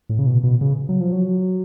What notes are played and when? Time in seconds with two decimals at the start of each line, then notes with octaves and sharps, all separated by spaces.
0.09 A2
0.19 C#3
0.26 B2
0.44 B2
0.61 C#3
0.89 F#3
1.00 F3
1.12 F#3